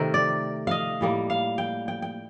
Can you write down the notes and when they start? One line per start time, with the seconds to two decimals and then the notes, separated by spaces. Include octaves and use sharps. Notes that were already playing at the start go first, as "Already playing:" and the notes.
Already playing: C3 D#3 A3 A#4
0.14 D5
0.67 D#5 F5
1.01 A2 G3 A#3
1.30 F5
1.58 G5
1.88 G5
2.02 G5